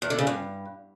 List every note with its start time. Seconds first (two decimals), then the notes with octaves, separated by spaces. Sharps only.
0.02 E2
0.10 D3
0.18 C#3
0.27 G2